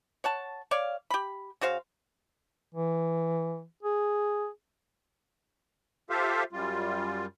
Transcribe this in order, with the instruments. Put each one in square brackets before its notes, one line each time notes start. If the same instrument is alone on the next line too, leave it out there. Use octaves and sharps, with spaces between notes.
[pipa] C#5 F#5 A5
C#5 D5 F5
G4 B5
C#3 F#4 C5 F5
[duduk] E3
G#4
[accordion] F4 G4 A4 C5 E5 F5
F#2 G3 F4